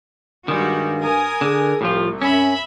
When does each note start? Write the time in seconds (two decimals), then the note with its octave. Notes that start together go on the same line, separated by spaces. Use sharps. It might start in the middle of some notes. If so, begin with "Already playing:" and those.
0.48 G2 D#3 G3 G#3 F#4
1.01 A#4 G#5 D#6
1.41 D3 G#4
1.81 C2 A2 F3 F4 G4
2.22 F#2 C#4 E5 B5